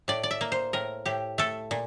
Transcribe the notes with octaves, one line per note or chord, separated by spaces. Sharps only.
A2 D5
D5
E5
A#3
C5
A2 A#4
A2 G4
A3 A4
A#2